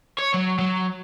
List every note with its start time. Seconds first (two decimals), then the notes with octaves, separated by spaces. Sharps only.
0.19 C#5
0.34 F#3
0.59 F#3